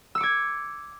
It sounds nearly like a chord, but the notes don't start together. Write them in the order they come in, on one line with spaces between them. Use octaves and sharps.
E6 C#7 D6 G#6